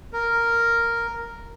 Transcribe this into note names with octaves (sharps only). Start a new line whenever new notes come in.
A#4